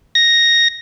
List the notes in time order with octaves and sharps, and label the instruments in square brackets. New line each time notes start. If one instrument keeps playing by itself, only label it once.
[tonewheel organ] A#6